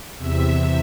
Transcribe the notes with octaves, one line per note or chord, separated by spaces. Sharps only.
E2 C3 E5